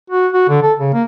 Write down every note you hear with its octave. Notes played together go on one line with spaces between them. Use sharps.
F#4
F#4
D3
A4
C#3
A#3